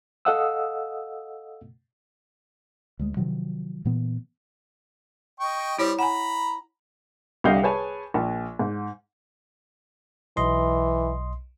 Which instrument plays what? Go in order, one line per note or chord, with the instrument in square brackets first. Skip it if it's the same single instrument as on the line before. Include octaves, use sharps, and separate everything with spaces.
[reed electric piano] A4 D#5 F5 F#5 D#6 E6
[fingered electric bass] D2 G#3
C3 D#3 F3 F#3
A#2 E3 B3
[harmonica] D#5 G5 C#6
[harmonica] G3 C4 [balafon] E4 C#5
[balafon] F#5 G#5 [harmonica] A#5 B5
[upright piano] C2 D3 G4 D#5 F5 G6
G#4 B4 C#5 G#5 A5
A#1
G#2
[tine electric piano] B1 D#5 C6 [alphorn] E3